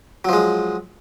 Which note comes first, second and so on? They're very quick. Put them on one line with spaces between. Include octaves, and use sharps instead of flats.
F#3 F3 G#3